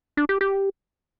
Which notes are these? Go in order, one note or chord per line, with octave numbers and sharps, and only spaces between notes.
D4
G4
G4